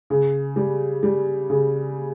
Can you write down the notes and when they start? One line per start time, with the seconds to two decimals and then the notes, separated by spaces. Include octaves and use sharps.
0.10 C#3
0.56 G3
1.03 G3
1.50 C#3